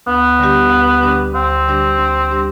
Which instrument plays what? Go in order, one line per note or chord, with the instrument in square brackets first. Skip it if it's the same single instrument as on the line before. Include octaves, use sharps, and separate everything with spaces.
[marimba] D2 [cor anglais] B3
[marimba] D3 G3 D4 G4
D2
D3 G3 D4 G4
[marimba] D2 [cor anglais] C4
[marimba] D3 G3 D4 G4
D2
D3 G3 D4 G4